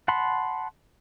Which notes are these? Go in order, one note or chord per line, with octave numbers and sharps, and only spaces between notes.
F#5 A5 B5 C6